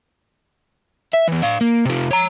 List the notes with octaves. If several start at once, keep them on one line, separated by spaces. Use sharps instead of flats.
E5
E3 B3
D4 F5
A#3
C3 F3
C#5 A#5